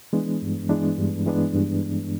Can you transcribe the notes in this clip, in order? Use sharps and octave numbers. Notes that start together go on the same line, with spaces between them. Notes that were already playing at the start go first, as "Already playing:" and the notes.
E3 G#3 B3 D4
G2
E3 G#3 B3 D4
G2
E3 G#3 B3 D4
G2